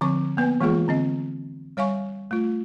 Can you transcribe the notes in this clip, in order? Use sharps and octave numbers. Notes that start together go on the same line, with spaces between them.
D3 F3 C4 C#6
A#3 B3 B4 G#5
E3 G#3 A#3 F4 G#4
D3 C4 D#5
G3 C#5 F5 G#5 C#6
A3 F4